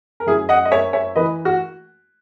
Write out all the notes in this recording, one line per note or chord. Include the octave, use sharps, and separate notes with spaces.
A#4
F#2 E4 G#4
D#5 F#5
D#5
A#3 C#5 E5
C#5 E5
E3 B4 D#5
F#4